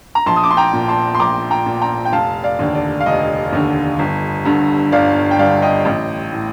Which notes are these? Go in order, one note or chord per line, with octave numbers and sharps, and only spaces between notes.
A#5
A#1 A5 C6
D#6
D6
C6
G5 A#5
A#2
A5 C6
C6
A#1 A#5 D6
G5 A#5
A#2
G5 A#5
G5
F1 F5 A5
D5 F5
D#2 D3
D5
F5
F1 D#5
D#2 D3
G1
G2 D3
G1 D5 F5
G5
G2 D3 D5 F5
D#5 G5
A1
A2